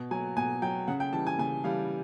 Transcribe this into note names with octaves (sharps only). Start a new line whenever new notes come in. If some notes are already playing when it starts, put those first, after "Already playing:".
Already playing: B2
F#3 G#5
B2 G#5
F#3 G5
C#3 F#5
G5
E3 G3 A5
G#5
C#3 G#5
E3 G3 F5